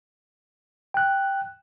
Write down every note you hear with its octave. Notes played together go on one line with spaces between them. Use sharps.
G5 F#6